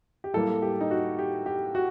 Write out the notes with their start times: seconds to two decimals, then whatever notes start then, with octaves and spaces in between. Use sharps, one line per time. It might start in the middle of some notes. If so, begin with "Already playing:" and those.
0.24 G4
0.33 A2 G3 A#3 A4
0.62 G4
0.81 D#4
0.91 F#4
1.19 G4
1.46 G4
1.75 F#4